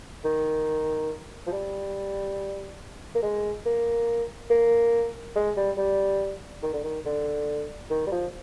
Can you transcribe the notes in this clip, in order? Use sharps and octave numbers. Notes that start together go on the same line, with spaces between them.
D#3
F3
G3
A#3
G#3
A#3
A#3
G#3
G3
G3
D#3
D3
D#3
D3
D#3
G3
F3